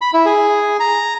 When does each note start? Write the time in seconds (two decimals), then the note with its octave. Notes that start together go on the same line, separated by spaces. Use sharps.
0.01 B5
0.13 E4
0.26 G#4
0.80 A#5